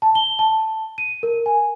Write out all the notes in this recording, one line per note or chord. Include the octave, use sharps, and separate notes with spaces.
A5
G7
A5
D#7
A#4
G#5